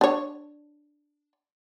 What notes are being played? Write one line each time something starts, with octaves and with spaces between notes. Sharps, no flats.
D4 C#5